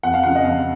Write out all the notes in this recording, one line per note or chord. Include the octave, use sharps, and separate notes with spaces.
F2 F#5
F5
C#3 F3 F#5
D#5
F2 F5